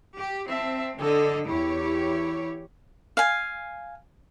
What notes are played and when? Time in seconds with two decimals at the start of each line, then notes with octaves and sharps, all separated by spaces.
0.18 G4
0.48 C4 E5 A5
0.99 D3 A4 D#5
1.47 E2 E4 G4 C#5
1.83 E4
3.17 F5 G#5